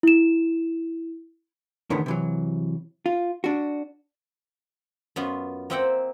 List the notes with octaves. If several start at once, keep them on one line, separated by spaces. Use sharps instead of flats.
E4 E7
E2 A2 D3 D#3 B3
C3 E3 F#3
F4
D4 F#4
F#2 B3 F4
A#3 C4 D#5 E5 F#5 G5